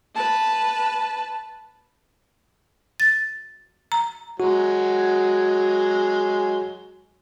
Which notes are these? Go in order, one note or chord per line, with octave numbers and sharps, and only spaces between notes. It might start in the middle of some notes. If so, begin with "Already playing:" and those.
B4 A5
A6
A#5
F#3 G#3 F#4